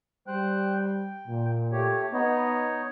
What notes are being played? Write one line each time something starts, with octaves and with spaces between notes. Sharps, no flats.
G3 C5 G5 F#6
G5
A#2
A3 G4 C#5
B3 D#4 C#5 D#5